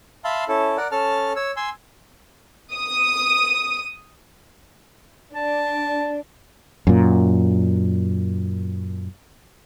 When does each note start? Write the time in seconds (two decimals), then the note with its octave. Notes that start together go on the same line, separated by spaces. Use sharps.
0.24 E5 F5 A5 B5 C6
0.48 C#4 E4 A4
0.77 A#4 D5 F#5
0.92 C#4 A4 A5 F6
1.36 C#5 E6
1.57 G#5 C6 E6
2.74 D#6
5.35 D4 A5
6.87 F#2 A#2